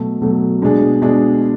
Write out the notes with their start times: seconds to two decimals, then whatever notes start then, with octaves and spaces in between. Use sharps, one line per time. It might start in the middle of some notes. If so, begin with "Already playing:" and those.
Already playing: B2 F#3 A3
0.21 B2 F#3 A3
0.62 B2 G#3 D4 G#4
1.02 B2 G#3 D4 G#4